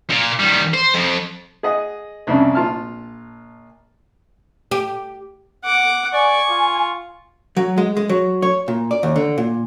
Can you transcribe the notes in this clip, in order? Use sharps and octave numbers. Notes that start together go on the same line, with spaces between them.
A#2
D#3 G3
C5
F2
G#4 D#5 F#5
C2 F2 C#3 D4
A#1 F4 A5 F6
G4
F#5 D6
D5 G#5 C#6
F4
F#3
G#3
G#3
F#3
C#5
A#2
D5
D#2
D3
A#2